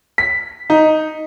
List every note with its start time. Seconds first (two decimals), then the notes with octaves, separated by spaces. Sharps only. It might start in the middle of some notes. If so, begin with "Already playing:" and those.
0.18 B6
0.70 D#4